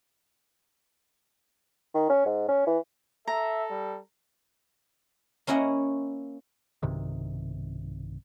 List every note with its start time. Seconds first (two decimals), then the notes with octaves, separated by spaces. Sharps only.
1.95 D#3
2.10 C#4
2.26 G#2
2.49 C#4
2.67 E3
3.28 A4 E5 A#5
3.71 G3
5.47 A#3 C#4 E4 D#5 F#5
6.83 B1 G2 C3 D#3